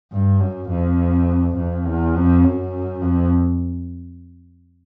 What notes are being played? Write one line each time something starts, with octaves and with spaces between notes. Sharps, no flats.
G2
F#2
F2
F2
E2
F2
F#2
F2